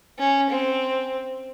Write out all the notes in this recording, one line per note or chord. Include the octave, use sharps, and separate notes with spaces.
C#4
C4